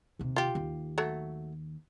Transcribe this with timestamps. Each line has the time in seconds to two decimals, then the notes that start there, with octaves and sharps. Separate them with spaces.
0.19 D#2 C3
0.36 F4 G4
0.55 D#2
0.98 F#3 A3